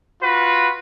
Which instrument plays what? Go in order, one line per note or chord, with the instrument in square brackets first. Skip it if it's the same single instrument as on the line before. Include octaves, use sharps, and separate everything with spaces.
[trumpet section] F4 F#4 B4